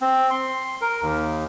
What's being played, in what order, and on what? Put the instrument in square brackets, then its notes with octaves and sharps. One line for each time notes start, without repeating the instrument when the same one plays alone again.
[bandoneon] C4
C6
A#4
D#2